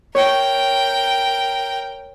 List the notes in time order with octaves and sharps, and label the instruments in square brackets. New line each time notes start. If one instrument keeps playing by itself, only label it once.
[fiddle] A#4 G5 [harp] C#5